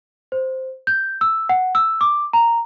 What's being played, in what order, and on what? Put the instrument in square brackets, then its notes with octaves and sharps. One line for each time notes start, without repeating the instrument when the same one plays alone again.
[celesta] C5
G6
E6
F#5
E6
D6
A#5